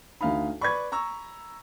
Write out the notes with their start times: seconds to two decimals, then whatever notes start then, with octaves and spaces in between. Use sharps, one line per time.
0.21 D2 D#4 F5 B5
0.61 B4 D5 B5 C#6 G#6
0.92 A#5 C#6 E6